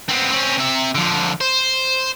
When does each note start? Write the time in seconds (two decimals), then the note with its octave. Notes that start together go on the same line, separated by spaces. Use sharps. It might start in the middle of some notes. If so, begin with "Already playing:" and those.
0.09 B3 C4
0.32 C4 C#4
0.58 C3 E5
0.95 D3 F3
1.41 C5